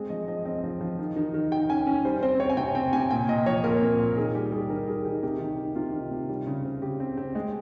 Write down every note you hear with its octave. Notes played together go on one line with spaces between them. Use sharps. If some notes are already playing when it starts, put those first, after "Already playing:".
Already playing: G#3 C4 G#4
F3 D#5
F3 D#5
C4 D#5
F3
F3
D#3
D#3
D#3
D#3 G5
C#4 G#5
C#4
G3 C5
C4 C5
C4 C#5
G#5
C3 G5
C4 G5
C3 G#5
A#2 G5
A#2 D#5
F3 C#5
A#2 A#4
C4
A#2
D#3 G#4
G3 G4
G3 G#4
D#3 A#4
G3 G#4
D#3 G4
C3 G4
D#3
D#3
C3 F4
D#3
C3
G3
C#3
C4
C#3 G4
C4
C4
G#3